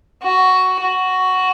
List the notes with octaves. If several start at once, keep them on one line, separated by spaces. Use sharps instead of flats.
F#4
F#4